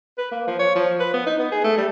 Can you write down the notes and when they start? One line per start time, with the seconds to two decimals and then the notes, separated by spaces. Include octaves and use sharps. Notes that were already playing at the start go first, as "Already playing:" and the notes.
0.18 B4
0.31 A#3
0.47 F3
0.59 C#5
0.75 F3
1.00 B4
1.13 B3
1.27 D#4
1.39 B3
1.51 G#4
1.64 A3
1.78 G3